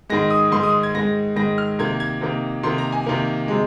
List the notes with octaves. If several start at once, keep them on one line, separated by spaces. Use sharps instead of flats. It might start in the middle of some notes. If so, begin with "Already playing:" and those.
G#2 D#3 G#3 A#6
D#6
G#2 D#3 G#3 C6
D#6
G#6
G#2 D#3 G#3 A#6
G#2 D#3 G#3 A#6
F6
C3 D#3 A#3 G#6
G#6
C3 D#3 A#3
C3 D#3 A#3 C6
A#5
G#5
C3 D#3 A#3
C3 G#3